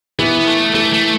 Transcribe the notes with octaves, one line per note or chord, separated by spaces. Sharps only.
E3 B3
A3
E3 A3
A3